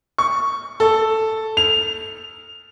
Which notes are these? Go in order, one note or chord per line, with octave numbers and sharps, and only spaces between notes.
C#6
A4
F7